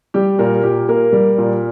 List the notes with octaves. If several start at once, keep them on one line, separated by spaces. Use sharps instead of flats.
G3 G4
A#2 A#4
A#2 G4
A#3 A#4
G3
A#2